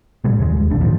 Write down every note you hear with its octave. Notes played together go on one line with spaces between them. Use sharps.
A2 C3 G3 G#3
F#1 D#2 C3 G#3
D#2
E1 A#1 D#2 D4
D2 G#2 D#3 F3